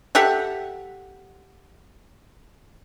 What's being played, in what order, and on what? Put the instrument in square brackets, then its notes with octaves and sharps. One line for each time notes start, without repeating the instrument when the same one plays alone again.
[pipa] G4 A4 E5 F#5